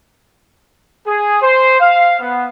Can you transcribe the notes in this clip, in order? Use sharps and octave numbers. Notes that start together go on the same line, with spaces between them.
G#4
C5
F5
B3